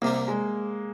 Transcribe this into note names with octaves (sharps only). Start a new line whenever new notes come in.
C2 C3 G3 A#3
G#3